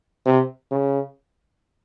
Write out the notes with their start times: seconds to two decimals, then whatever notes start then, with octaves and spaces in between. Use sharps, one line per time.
0.26 C3
0.71 C#3